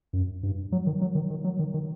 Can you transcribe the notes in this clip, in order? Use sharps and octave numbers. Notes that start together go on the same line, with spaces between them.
F#2
G2
F#3
D#3
F#3
D#3
D#3
F#3
D#3
D#3